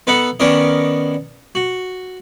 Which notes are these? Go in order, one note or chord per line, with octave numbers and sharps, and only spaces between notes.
B3 D#4 A4 B4 F#5
D#3 B3 C#4 D4 A#4 D#5
F#4